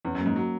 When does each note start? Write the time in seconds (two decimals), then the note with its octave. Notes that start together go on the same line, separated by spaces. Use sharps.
0.05 E2 C#4
0.15 F#2 A#3
0.26 G#2
0.36 F#3